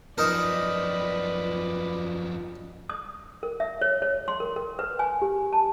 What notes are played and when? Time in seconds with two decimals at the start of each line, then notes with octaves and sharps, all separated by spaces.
0.18 F#2 F3 D#4 A#4 B4 D5
2.90 D#6
3.43 A#4
3.60 E5
3.81 C#5
4.02 C#5
4.28 C6
4.40 A#4
4.56 A#4
4.79 B4
4.99 G#5
5.22 G4
5.53 A5